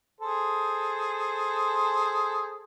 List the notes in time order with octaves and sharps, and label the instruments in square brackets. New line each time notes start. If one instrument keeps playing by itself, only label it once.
[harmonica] G#4 A4 C5